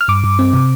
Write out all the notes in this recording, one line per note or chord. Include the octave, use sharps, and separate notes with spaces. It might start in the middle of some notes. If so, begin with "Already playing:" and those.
F6
G2 D6
G2
C4
C3